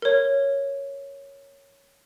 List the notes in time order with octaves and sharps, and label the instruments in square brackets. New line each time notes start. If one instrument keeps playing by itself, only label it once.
[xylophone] A#4 C#5